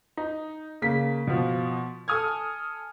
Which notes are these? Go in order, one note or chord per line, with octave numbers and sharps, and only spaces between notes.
D#4
C#3 A#3 B6
B2 F3
A4 G#5 D#6 F6 G#6